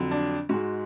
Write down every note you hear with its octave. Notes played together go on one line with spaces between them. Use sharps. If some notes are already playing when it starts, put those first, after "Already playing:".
Already playing: F2 D3 F#3
D4
G#2 G#3 F#4